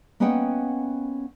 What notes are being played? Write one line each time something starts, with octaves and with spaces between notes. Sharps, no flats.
A#3 B3 C#4 D#5 F#5 G5